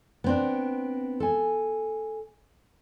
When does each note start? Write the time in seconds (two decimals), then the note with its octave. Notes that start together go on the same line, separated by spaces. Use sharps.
0.24 B3 C4 D4
1.20 A4 G#5